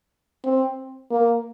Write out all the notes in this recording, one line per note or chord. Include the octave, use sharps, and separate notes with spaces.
C4
A#3